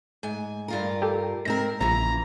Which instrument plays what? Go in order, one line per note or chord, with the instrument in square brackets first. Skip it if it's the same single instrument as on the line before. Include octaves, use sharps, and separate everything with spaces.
[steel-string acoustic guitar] G#2 G#5
G2 F4 A#4
[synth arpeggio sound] G4 A4
[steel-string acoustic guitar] G#2 C4 A#4 [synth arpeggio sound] A#6
[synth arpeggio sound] A#1 [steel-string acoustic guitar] C#3 E3 [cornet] A#5